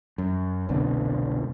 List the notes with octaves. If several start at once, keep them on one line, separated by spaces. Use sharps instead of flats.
F#2
F1 C2 B2 D3